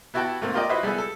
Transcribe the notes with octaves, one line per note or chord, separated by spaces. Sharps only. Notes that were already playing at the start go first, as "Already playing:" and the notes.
B3 E4 F#4 G4 G5 A5
G#2 A3 A#3 C4
F4 G4 A#4 D5 D#5 G5
E4 F#4 B4 C5 D#5 E5
G3 G#3 B3 E4 G#4 A4
A4